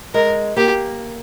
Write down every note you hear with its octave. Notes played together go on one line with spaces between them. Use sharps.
G#3 A#4
A#3 G4